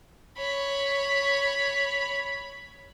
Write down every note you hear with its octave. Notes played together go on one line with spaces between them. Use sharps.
C#5 B5